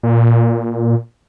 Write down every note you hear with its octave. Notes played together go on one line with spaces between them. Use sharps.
A#2